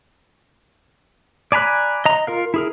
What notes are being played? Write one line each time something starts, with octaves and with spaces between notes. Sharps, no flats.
D5 G#5 A#5 B5 F#6
D#5 A#5
F4 A#4 F5
E4 G#4 A#4